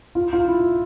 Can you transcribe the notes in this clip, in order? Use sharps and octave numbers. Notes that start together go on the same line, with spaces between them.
F4
F4
E4